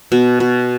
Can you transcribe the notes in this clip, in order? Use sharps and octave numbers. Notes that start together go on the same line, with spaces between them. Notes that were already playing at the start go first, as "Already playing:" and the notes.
B2
B2